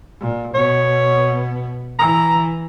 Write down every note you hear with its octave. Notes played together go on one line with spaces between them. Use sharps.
A#2
B2 B3 C#5
E3 A#5